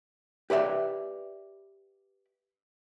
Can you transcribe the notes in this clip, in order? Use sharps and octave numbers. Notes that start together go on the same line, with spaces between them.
G4 B4 D5 E5